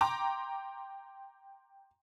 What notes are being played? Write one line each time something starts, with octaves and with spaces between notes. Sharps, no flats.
G5 A#5 C6 D6